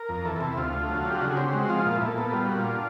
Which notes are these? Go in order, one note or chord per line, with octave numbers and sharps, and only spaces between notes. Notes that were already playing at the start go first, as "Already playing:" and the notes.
Already playing: A#4
F2
E3 A4
C3 A4
E4
D2 F4
A3
F#3
D3
G4
C#3 F#4
G#4
C4 G4
G#3 F#4
F3 F4
A#2 F4
E4
A#2 A4
B3 A4
G3 F4
A#2 F#4
F4
D4